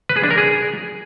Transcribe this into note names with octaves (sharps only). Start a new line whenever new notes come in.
B4
G#4
D4
A#4
G#4